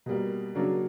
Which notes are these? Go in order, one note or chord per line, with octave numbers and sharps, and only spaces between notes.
B2 G3 A#3
C#3 F#3 A#3 D4